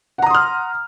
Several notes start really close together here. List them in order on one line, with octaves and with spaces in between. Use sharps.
F#5 A#5 D#6 C6 F6